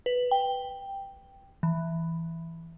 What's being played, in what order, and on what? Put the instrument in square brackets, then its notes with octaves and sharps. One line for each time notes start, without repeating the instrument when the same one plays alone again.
[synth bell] B4
G5
E3